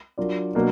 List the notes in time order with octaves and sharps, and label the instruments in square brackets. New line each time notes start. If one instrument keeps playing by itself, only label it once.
[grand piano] F#3 D4 F4 A#4 D5
B2 F#3 A#3 D4